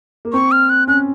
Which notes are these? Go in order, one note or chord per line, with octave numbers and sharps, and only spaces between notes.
A#3
C4 C#6
F6
F#6
C#4 F#6